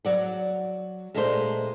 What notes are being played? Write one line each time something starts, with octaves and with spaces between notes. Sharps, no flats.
F#3 D5 F#5
A#2 G#3 A3 D4 F#4 C5